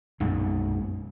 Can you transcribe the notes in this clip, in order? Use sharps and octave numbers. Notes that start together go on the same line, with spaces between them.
B1 F#2 A#2 G#3